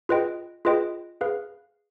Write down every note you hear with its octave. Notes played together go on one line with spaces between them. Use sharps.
F4 G#4 B4 D#5 G5
F4 G#4 B4 D#5 G5
G#4 B4 F5